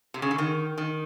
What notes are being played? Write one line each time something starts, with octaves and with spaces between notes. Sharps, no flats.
C3
C#3
D3
D#3
D#3